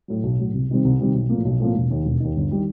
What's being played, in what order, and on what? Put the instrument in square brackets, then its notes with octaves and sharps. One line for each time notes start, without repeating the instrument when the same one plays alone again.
[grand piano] A2 F#3
B1
A2 F#3
C2
C3 D#3 G3 C4
C2
C3 D#3 G3 C4
B1
A2 F3 A#3
B1
A2 F3 A#3
E1
D#2 D#3
E1
D#2 D#3
G1
D#3 G3